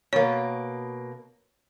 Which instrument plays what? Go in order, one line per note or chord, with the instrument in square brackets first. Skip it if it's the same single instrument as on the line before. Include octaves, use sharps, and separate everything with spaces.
[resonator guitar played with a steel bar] B2 A#3 [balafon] C#5